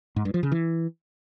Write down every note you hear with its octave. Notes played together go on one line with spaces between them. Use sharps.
G#2
G2
F3
C#3
E3